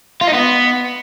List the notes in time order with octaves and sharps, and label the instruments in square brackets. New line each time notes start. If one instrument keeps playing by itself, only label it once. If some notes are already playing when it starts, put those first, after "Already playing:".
[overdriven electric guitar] F4
D#4
B3